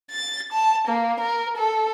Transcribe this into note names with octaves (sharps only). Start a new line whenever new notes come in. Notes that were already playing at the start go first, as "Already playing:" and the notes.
A6
A5
A#3
A#4
A4